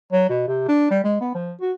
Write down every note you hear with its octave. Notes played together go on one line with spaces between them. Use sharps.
F#3
B2
C3
D4
G3
G#3
B3
F3
F#4